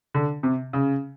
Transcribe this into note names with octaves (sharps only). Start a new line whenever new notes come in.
D3
C3
C#3